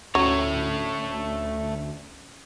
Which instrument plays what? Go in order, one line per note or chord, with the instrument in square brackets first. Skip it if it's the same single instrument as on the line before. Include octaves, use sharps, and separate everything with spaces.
[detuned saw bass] D2 [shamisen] F#3 [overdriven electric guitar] A3 C#5 [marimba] C#4